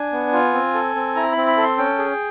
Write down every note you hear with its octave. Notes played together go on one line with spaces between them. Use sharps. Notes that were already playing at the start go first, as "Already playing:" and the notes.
Already playing: D4 G#5
B3
F4
C4
A4
C4
E4 A#5
B5
C4
B5
A4
C6
C#4 G5
G#4